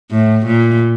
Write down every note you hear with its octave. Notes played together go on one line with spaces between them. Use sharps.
A2
A#2